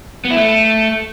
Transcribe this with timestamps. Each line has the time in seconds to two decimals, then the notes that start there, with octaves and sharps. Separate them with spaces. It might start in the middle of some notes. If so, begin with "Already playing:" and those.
0.25 B3
0.31 E4
0.37 A3